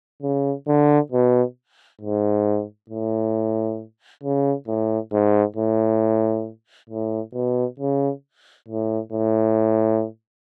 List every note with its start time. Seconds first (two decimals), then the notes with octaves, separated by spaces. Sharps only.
0.22 C#3
0.68 D3
1.11 B2
2.01 G#2
2.90 A2
4.23 C#3
4.68 A2
5.12 G#2
5.56 A2
6.89 A2
7.34 B2
7.79 C#3
8.68 A2
9.12 A2